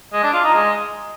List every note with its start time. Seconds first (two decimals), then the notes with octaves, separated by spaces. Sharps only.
0.13 G#3
0.23 D4
0.33 F4
0.43 D#4
0.54 G#3